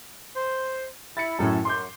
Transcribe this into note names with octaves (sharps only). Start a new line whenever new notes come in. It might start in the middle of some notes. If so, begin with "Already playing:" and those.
C5
E4 A6 C#7
F#2 A2 C#4 A4
F#2 C6 D6 G6